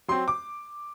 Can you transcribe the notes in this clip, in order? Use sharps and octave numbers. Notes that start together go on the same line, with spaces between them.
F#3 C4 C6
D6